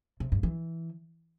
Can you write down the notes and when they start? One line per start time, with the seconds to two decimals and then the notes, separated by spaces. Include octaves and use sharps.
0.20 C3
0.32 G2
0.43 E3